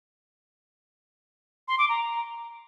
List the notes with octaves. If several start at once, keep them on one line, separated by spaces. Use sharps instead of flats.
C6
D6
A#5